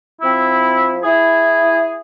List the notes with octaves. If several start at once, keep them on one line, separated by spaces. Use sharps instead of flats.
F3 C4 E4
E4 G#4